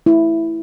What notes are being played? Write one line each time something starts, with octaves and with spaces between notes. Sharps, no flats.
E4